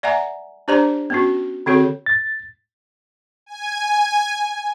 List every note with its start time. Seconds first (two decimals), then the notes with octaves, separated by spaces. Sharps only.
0.03 D5 E5 F#5 G#5 A#5
0.68 D4 G4 C5 D5 A#5
1.10 B3 C#4 F#4
1.66 D3 C4 F#4 G#4 A4 C#5
2.06 A6
3.46 G#5